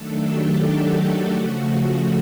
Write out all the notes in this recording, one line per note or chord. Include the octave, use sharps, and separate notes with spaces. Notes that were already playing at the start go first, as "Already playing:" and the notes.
Already playing: D#3 F#3 A3 D4 A4
G4
F#4
C#3 F3 A3